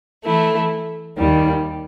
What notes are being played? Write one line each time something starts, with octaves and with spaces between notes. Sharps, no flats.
E3 A3 E4
D#2 D#3 G3